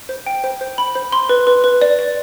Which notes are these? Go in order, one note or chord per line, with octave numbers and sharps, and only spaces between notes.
C5
G5
C5
C5
B5
C5
C6
B4
B4
B4
D5
D5